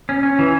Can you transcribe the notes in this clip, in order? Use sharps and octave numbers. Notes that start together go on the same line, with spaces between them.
C#4
C#4
E3